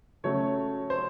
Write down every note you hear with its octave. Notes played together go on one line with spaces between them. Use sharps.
C#3 F#3 A3 C#5
C5